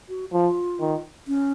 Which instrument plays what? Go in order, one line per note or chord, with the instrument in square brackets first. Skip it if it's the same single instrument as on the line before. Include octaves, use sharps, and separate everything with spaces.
[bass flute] F#4
[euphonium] F3 [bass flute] F4
[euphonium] D#3
[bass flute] C#4